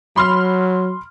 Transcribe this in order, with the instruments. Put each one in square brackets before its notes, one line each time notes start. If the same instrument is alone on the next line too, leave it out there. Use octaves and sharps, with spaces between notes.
[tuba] F#3 [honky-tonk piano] B5 C6 F6